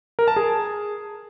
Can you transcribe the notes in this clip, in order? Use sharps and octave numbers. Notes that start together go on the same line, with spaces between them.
A#4
A5
G#4